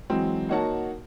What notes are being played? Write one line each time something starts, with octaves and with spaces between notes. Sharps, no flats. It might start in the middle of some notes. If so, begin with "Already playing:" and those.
E3 F#3 G#3 C4
A#3 D#4 F#4 C#5 F#5 A5